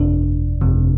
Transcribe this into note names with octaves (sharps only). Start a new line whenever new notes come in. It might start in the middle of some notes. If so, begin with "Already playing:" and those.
Already playing: G1 F2 C3 D4
G1 F2 C3